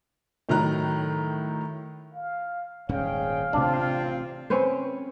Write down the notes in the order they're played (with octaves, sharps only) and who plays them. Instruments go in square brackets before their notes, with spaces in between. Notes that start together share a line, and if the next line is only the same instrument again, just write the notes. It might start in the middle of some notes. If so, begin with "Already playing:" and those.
[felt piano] A2 D#3 F#3 E4 A#5 F#6
[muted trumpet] F5
[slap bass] D#1 G#2 C#4 [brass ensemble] G#4 C#5 G5 [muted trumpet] F5
[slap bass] A1 C3 [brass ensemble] C4 F4 [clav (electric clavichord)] D4
[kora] C4 C#4 B4 C5